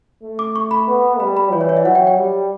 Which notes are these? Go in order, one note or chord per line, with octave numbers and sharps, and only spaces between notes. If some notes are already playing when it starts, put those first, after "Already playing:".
A3
D6
C#6
B5
B3
G3 B5
B5
E3 D5
C#5
D5
E5
F#3 F#5
G5
G5
G3